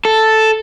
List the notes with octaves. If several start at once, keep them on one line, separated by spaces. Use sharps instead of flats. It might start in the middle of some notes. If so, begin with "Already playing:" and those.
A4